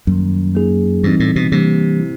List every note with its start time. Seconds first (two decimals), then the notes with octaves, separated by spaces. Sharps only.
0.07 F#2 D#3 G3 A#3
0.55 A#3 D#4 G#4
1.03 G2 E3 G3 C4 D#4
1.20 A2
1.36 B2
1.52 C3 E3 G3 A#3 D4 G4
2.00 E4